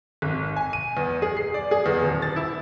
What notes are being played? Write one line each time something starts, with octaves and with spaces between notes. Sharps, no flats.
G#1
G#5
D#7
E2
G#4
C7
D5
G#4
E2
D#1
A6
E4